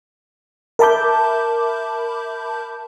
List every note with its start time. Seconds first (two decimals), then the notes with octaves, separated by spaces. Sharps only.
0.79 A#4 E5 A5 B5 D6 G6